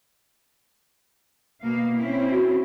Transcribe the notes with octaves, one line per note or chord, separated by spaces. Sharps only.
B2 A#3 F5
C4 C#4 E4
F#4